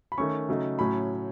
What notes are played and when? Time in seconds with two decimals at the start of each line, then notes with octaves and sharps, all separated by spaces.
0.12 B5
0.18 D#3 A3 C#4 C#6
0.49 C#3 F#3 A3 D#4
0.79 A2 F#3 C#4 B5